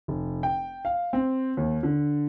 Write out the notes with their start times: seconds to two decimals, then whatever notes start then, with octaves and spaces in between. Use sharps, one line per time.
0.08 F1
0.43 G5
0.85 F5
1.13 C4
1.57 D#2
1.83 D3